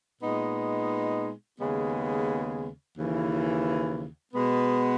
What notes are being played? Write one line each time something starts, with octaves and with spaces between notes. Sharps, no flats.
A#2 G#3 B3 D#4
D#2 C#3 G#3 B3
D#2 C#3 E3
B2 G#3 B3